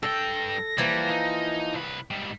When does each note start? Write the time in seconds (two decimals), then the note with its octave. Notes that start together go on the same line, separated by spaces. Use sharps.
0.03 G2 A4 G5 A#6
0.78 E3 F3 G3 A#3
1.11 D#4
1.74 C2 B4
2.11 G#2 G3